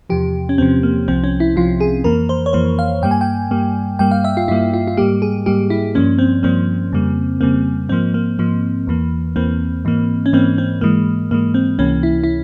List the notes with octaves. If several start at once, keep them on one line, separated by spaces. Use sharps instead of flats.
E2 C3 F3 G4
C#4
E2 C3 F3 C4
A#3
C2 C3 F3 C4
C#4
E4
C2 C3 F3 F4
G#4
F2 E3 A#3 A#4
C5
C#5
F2 E3 A#3 C5
F5
G2 G3 A#3 G5
G#5
G5
G2 G3 A#3
G2 G3 A#3 G5
F5
E5
F4
G2 G3 A#3 E4
F4
F4
G#2 G3 A#3 G4
G#4
G#2 G3 A#3 G4
E4
G2 F3 A#3 C#4
C4
G2 F3 A#3 C4
F2 C#3 G3 A#3
F2 C#3 G3 A#3 C4
G#2 F3 A#3 C4
A#3
G#2 F3 A#3
E2 E3 A#3
E2 E3 A#3 C4
G#2 E3 A#3
C#4
G#2 E3 A#3 C4
C4
G#2 E3 G#3 A#3
G#2 E3 G#3 A#3
C4
C#2 C3 E3 A#3 C#4
E4
E4